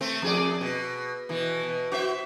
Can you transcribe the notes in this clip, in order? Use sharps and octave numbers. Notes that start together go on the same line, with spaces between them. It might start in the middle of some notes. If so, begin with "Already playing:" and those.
A3 C4
F2 G#4 D5
B2
B2 E3
B2
F#4 C5 E5